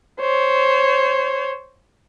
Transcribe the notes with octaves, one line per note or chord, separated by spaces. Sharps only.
C5 C#5